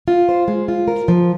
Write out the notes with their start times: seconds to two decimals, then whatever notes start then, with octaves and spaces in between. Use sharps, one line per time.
0.08 F4
0.29 C5
0.48 G#3
0.68 F4
0.88 A#4
1.08 F3